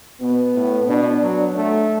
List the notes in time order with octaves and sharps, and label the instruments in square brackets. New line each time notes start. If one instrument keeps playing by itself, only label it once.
[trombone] B2 [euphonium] B3
[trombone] A2
[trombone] B2 [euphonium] D4
[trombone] F#3
[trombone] A3 [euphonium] D4